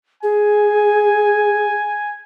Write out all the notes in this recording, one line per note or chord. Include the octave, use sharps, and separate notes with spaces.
G#4 G#5